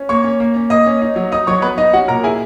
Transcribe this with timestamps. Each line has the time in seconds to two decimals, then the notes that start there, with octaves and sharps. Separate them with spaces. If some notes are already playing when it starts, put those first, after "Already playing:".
Already playing: C#4
0.09 A#3 C#5 C#6
0.24 C#4
0.40 A#3
0.56 C#4
0.70 A#3 D#5 D#6
0.86 C#4
1.02 D#4
1.16 F#3
1.32 D#4 D#5 D#6
1.47 F#3 C#5 C#6
1.62 B3 B4 B5
1.78 D#4 D#5
1.93 C#4 F#4 F#5
2.08 A#2 A#4 A#5
2.23 E4 G#4 G#5